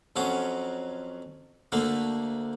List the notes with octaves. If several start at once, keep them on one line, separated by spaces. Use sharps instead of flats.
F2 F3 F#3 C#4 D#6
D2 D3 A3 A#3